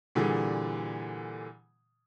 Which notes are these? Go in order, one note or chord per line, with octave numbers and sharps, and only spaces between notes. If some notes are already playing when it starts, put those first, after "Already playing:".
A#2 D3 E3 G3 G#4